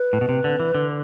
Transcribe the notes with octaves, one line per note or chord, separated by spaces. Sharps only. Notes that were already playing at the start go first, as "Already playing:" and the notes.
Already playing: B4
A2
B2
C3
D3
E3
D3